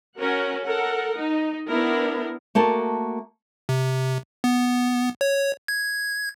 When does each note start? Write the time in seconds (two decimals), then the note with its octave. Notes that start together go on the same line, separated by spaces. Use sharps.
0.18 C#4 F#4 A#4 F#5
0.64 A4 A#4 F#5
1.16 D#4
1.68 B3 D4 E4 A#4
2.55 A3 A#3 F#4 A5
3.69 C3
4.44 B3
5.21 C#5
5.68 G#6